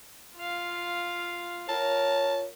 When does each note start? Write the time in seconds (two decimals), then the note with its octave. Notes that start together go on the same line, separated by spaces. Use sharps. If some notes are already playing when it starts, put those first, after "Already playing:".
0.37 F4 F5
1.69 F4 A#4 C#5 A5